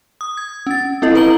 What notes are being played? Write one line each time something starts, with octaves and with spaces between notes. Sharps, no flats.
D#6
G#6
C#4 A6
C4 E4 A4 D#5
C4 B4 A#5 F#7 G7